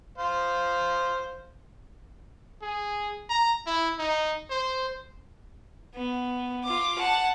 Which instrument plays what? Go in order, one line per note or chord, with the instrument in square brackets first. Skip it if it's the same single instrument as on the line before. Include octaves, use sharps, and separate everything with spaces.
[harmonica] C5 F5
[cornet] G#4
A#5
E4
D#4
C5
[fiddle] B3
F4 D6
F#5 A5